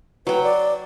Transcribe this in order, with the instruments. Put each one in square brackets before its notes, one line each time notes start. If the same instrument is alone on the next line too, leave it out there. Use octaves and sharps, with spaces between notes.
[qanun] F#3 G5 [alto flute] B4
[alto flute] D5